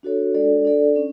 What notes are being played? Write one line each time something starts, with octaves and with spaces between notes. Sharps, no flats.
D4 F#4 A4 C#5
G#3 D4 A4 D5
D4 A4 D5
C#4